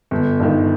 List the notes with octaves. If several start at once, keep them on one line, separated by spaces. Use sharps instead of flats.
G1
G2 D#3